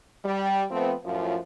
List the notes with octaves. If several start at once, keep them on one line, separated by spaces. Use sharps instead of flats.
G3
F3 A3 B3 C4
F#2 A2 F3